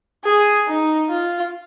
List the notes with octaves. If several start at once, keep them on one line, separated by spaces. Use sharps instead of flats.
G#4
D#4
F4